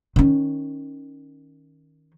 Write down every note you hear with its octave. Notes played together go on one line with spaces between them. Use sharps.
D#3 C#4